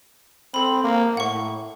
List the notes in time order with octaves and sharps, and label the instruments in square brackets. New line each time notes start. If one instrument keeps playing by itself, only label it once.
[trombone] C4 [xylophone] A4 B5
[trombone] A#3
[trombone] A2 [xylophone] F#5 C#6